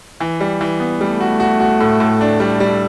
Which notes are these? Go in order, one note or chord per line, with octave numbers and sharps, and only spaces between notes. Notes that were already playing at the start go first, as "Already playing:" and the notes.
E3
G3
E3
B3
G3 A3
F#4
F#4
F#4
A2
A2
D4
G3
G3